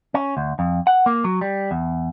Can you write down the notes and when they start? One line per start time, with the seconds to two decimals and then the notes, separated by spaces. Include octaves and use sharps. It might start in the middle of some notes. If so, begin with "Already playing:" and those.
0.14 C#4
0.37 D2
0.59 F2
0.87 F#5
1.06 A#3
1.24 F#3
1.41 G3
1.71 E2